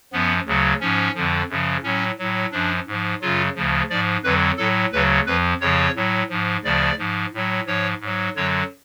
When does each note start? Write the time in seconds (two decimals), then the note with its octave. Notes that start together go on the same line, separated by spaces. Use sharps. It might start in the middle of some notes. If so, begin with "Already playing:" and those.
0.13 F#2 F3 B3
0.46 D2 C#3 F#3
0.80 G#2 F3 C#4
1.14 F2 D3 F3
1.50 F#2 C#3 F3
1.83 A2 F#3 C#4
2.19 A2 F#3
2.52 F#2 F3 D4
2.87 G#2 F3
3.21 F#2 C#3 F#3 F4
3.55 D2 C#3 F3
3.90 G#2 F3 D5
4.24 F2 D3 F#3 B4
4.58 A2 F#3 A4
4.92 D2 C#3 F#3 B4
5.26 F2 F3 B4
5.60 F2 C#3 F3 C#5
5.96 A2 F#3
6.30 G#2 F3
6.64 D2 C#3 F3 D5
6.98 G#2 F3
7.33 A2 F#3
7.66 G#2 F3 C#5
8.01 G#2 F#3
8.36 F#2 D3 F#3 C#5